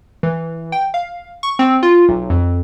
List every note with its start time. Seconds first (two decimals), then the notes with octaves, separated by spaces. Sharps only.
0.23 E3
0.72 G5
0.94 F5
1.43 C#6
1.59 C4
1.83 F4
2.09 B1
2.30 F2